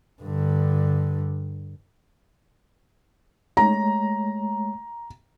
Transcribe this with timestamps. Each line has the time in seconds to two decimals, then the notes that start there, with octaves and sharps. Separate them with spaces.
0.22 G2 D3
3.57 G#3 A3 C#5 A#5